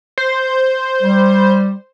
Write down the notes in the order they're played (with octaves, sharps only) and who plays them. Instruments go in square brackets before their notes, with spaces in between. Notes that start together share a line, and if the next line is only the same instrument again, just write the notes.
[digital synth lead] C5
[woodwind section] G3